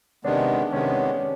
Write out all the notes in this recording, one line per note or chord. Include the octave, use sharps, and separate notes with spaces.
C3 D#3 G#3 B3 D4
C3 D#3 G#3 B3 C#4